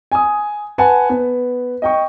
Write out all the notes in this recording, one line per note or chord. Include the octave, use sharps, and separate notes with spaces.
G#5 D#6
B4 F#5 G#5 A5
B3
D#5 G5 C#6